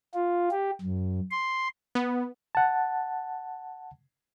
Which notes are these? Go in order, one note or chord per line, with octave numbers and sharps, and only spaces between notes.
F4
G4
F#2
C6
B3
F#5 A5